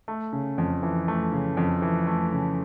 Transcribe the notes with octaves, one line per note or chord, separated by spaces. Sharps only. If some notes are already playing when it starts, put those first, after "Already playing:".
A3
C#3
F2
E3
A3
C#3
F2
E3
A3
C#3